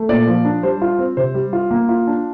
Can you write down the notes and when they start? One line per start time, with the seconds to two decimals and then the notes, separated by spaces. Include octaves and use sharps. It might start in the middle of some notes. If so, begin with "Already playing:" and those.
Already playing: A3
0.09 A#2 D5
0.27 F3
0.45 D4
0.63 G3 C5
0.82 F4
0.99 C4
1.17 C3 C5
1.34 G3
1.53 F4
1.71 A#3
1.89 F4
2.07 D4